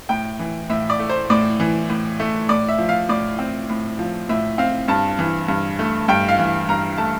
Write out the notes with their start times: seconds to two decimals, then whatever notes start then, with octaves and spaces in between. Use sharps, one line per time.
0.09 A2 G5
0.40 E3
0.70 A2 E5
0.90 D5
0.99 A3
1.09 C5
1.30 A2 D5
1.60 E3
1.90 A2
2.20 A3
2.49 A2 D5
2.69 E5
2.78 F3
2.89 F5
3.09 A2 D5
3.39 C4
3.69 A2
3.99 F3
4.29 A2 E5
4.58 C4 F5
4.88 G2 A5
5.19 E3
5.48 G2
5.79 A3
6.08 G2 G5
6.28 F5
6.39 E3
6.69 G2 A#5
6.98 A3 A5